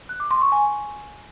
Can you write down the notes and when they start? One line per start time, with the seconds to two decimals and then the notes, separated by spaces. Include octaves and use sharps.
0.09 F#6
0.20 D6
0.31 C6
0.41 C#6
0.52 G#5